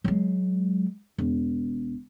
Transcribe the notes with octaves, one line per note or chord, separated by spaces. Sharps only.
F#3 G#3
E1